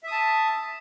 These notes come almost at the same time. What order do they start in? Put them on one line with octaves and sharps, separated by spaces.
E5 D#6 A5